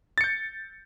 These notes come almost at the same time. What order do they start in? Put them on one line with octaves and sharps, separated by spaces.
A6 C#7 G6